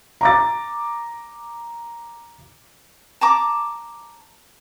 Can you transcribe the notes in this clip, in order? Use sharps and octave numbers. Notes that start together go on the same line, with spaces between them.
A#5 D6 A6
A5 A#5 D6